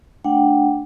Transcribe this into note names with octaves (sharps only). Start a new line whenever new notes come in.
A3 D4 F#5 G5